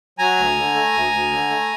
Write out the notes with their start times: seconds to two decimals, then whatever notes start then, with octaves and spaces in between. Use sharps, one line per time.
0.19 F#3 G#5 A#5
0.37 D2
0.56 D3
0.74 A3
0.93 D2
1.12 D2
1.31 D3
1.50 A3